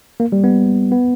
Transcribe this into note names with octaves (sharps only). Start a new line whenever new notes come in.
A#3
G3
B3
B3